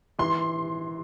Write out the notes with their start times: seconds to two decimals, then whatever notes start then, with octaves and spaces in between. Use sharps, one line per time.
0.19 E3 C6